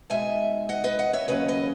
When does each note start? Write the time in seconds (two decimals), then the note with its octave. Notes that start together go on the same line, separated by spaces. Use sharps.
0.10 B2 G#3 D#4 E5 G#5
0.69 D#5 F#5
0.84 B4 D#5
0.99 D#5 F#5
1.13 C#5 E5
1.28 D#2 C#3 F#3 C#4 B4 D#5
1.48 B4 D#5